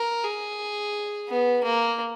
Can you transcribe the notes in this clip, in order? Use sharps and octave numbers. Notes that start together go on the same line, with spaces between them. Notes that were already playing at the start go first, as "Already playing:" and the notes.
Already playing: A#4
G#4
B3
A#3